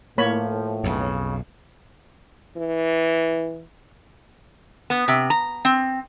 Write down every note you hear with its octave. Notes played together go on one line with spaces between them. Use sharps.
A2 F3 A#3 C#5 B5
B1 F2 C#3
E3
B3
C3
A#5
C4